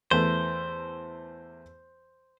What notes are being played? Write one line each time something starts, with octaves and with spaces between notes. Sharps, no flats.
E2 A3 B4 C5